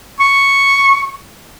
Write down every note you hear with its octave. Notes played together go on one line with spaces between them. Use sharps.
C#6